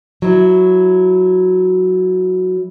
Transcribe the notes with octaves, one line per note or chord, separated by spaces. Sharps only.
F#3 E4